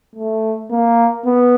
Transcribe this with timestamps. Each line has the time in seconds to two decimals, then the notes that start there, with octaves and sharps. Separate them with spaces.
0.16 A3
0.71 A#3
1.26 B3